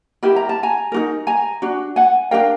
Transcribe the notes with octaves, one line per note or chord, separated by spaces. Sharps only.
E4 G4 A#4 B5
A#5
A5
G#5 A#5
D#4 F#4 A#4
G#5 A#5
D4 F#4
F#5 G#5
D4 G4 A#4 F5 G5